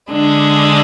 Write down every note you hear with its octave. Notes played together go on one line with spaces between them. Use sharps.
D3 G#3 D4